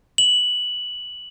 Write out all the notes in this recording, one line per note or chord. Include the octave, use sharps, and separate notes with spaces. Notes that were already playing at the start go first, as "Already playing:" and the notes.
F#7